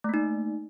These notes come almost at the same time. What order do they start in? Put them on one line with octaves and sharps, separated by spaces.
A3 A#3 D#4